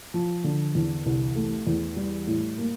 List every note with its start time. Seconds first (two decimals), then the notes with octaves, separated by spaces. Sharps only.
0.14 F3
0.44 D3
0.75 E2
1.06 C2
1.36 A3
1.67 E2
1.96 G3
2.27 A2
2.58 A#3